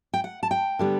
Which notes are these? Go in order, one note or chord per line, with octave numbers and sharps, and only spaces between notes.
G5
F#5
A5
G5
D3 G3 B3